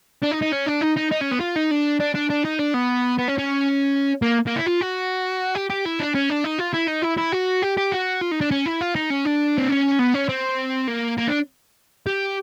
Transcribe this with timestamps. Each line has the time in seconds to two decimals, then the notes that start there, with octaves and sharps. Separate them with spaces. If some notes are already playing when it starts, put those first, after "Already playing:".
0.23 D4
0.32 D#4
0.42 D#4
0.53 C#4
0.67 D4
0.82 D#4
0.97 D#4
1.12 D#4
1.21 C#4
1.32 B3
1.41 F4
1.56 D#4
1.71 D4
2.00 D4
2.15 D4
2.30 D4
2.45 D#4
2.59 D4
2.74 B3
3.19 B3
3.28 C#4
3.38 C#4
4.22 A#3
4.47 A#3
4.56 E4
4.67 F4
4.81 F#4
5.55 G4
5.70 G4
5.85 E4
6.00 D4
6.15 C#4
6.30 D4
6.44 D#4
6.59 F4
6.74 E4
6.88 D#4
7.03 E4
7.18 E4
7.33 F#4
7.63 G4
7.78 G4
7.92 F#4
8.21 F4
8.31 D#4
8.41 D4
8.51 C#4
8.66 E4
8.81 F4
8.96 D#4
9.10 C#4
9.25 D4
9.58 C4
9.69 C#4
9.99 B3
10.14 C#4
10.29 C4
10.88 A#3
11.18 A#3
11.28 D4
12.07 G4